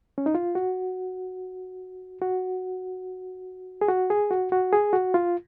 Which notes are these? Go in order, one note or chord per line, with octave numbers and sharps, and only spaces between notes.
C#4
D#4
F4
F#4
F#4
G#4
F#4
G#4
F#4
F#4
G#4
F#4
F4